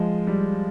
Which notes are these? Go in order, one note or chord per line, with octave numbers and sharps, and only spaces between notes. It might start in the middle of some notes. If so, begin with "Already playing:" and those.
Already playing: F3 G#3
G3